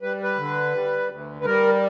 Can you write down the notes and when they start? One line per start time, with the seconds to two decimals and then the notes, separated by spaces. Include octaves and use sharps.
0.02 G3 B4
0.23 B4
0.38 D3
0.74 G3
1.10 D2
1.41 B4
1.46 G3 A#4